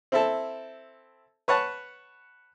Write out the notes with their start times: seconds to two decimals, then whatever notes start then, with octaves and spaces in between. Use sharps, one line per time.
0.12 C4 E4 A4
1.48 B4 C#5 F#5 A5